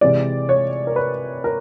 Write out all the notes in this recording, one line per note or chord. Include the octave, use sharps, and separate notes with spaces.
C3 E3 G#3 D5
C#5
A#4
B4
A#4